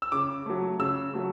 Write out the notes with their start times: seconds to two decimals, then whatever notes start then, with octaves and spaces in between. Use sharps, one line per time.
0.02 E6
0.12 C#3 D6
0.46 F#3 A3
0.79 C#3 E6
1.14 F#3 A3